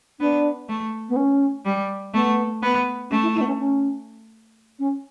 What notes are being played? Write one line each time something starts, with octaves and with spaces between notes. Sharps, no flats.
B3 D4
A3
B3
C#4
G3
A3 B3
B3
A3 C#4
E4
E4
B3
C#4
C#4
C#4